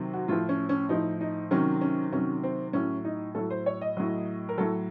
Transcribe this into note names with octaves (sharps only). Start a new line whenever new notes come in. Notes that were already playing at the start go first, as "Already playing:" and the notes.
Already playing: C3 D#3 F#3
F#4
A2 F3 F4
C#4
C#4
A2 F3 D#4
D#4
C3 D#3 F#3 C#4
C#4
C3 D#3 F#3 C#4
C4
A2 F#3 C#4
D#4
A2 F#3 A4
C5
C#5
D#5
A2 F#3
A#4
A2 F#3 A4